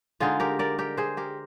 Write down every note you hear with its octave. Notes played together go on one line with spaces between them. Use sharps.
D3 G#3 D#4 F4 G#4
G4 A#4
A#4 D5
G4 A#4
G#4 C5
G4 A#4